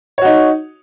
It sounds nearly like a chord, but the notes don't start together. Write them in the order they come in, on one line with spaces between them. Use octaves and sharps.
C#5 F#4 D#4